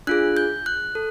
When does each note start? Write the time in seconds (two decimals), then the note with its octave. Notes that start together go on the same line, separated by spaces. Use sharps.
0.07 D4 F4 G#4 F#6
0.37 G6
0.66 F#6
0.95 A4